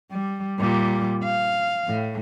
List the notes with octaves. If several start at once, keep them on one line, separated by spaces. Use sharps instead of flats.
G3
A#2 G3
F5
A2